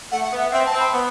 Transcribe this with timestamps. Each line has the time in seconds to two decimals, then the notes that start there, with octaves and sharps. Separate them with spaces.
0.11 A3 F#5
0.24 F#5
0.32 B3
0.38 E5
0.52 C4 E5
0.66 A5
0.72 C4
0.79 B5
0.93 B3